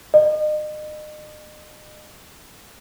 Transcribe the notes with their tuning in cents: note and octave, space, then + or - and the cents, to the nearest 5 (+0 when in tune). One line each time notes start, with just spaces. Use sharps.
D#5 -35